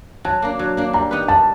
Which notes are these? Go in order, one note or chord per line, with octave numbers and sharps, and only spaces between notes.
F#3 A5
A#3 D4
F#3
A#3 D4
G3 A#5
B3 D#4 G4 B4
G3 A5